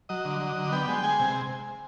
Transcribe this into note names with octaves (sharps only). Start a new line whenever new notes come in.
F#3 D#5
D3
F#3
D3
B3 G5
G#3
G#3 G#5
C3